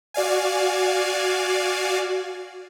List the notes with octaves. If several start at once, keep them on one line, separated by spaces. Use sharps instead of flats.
F#4 D5 F5 G#5